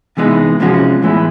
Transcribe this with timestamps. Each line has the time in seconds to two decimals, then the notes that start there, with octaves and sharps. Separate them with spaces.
0.17 C3 E3 G#3 B3 D#4
0.60 C3 F3 G#3 C#4 F#4
1.02 A2 E3 G#3 B3